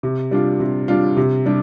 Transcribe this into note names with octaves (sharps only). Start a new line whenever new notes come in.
C3
G3 D4 F4
C3
G3 D4 F4
C3
G3 D4